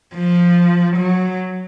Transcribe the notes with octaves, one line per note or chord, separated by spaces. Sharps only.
F3
F#3